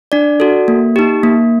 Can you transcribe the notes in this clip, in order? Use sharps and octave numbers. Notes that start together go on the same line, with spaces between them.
D4 D5
F#4 A4
A#3
D#4 G4
A#3